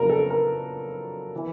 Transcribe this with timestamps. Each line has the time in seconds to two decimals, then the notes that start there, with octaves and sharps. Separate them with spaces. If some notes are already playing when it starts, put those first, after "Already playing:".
Already playing: F2 C#3 F#3 B3 D4 A#4
0.10 A4
0.30 A#4
1.36 E3